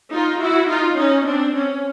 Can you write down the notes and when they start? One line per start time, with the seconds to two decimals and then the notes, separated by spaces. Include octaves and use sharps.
0.13 D#4 F4
0.41 E4 F#4
0.69 D#4 F4
0.98 C#4 D#4
1.26 C4 D4
1.54 C#4